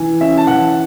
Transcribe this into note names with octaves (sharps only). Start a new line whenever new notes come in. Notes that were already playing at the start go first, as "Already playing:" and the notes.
Already playing: E3
C#4 E5
A5
E3 F#5